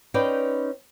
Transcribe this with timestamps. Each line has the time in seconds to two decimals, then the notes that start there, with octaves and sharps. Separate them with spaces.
0.14 C#4 D#4 B4 C5 D5 G5